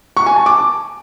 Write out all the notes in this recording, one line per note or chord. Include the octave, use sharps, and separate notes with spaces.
C#6
G#5
A5
D6